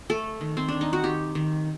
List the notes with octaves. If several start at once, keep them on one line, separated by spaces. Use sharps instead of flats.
A3 A4
D#3
C4
D#3 D4
D#4
F#4
D#3 G4
D#3